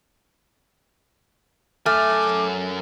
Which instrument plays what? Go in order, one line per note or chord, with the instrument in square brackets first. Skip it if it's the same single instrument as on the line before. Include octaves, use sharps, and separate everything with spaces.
[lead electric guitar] F#2 G#5 [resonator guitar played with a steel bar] A3 [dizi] D6 [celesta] F6